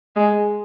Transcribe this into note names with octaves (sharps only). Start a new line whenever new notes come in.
G#3